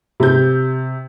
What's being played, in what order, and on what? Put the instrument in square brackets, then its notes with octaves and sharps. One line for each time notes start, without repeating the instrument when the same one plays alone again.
[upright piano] C3 G6